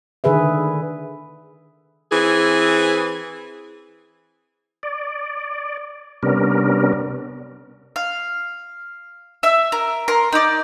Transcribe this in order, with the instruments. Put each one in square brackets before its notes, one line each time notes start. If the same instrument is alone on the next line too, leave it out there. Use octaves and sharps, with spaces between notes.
[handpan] D3 D#3 G#4 B4 E5
[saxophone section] E3 C4 G#4
[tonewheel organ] D5
C3 G3 B3 C#4 D4 A#4
[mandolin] F5
E5 E6
A#4
A#4 C6
D#4 D5